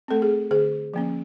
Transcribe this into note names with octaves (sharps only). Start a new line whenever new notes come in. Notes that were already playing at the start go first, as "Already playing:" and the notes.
A3 C4 A4
G#4
D3 G#4
F3 A#3 C#4